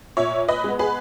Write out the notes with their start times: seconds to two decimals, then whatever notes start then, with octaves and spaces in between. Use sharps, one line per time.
0.17 A#2 C#5 E5
0.48 B4 D#5
0.64 G#3 B3
0.79 G#4 B4